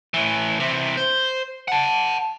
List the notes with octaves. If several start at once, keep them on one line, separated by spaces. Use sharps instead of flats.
A2 E3
C3 E3
C5
F#5 A5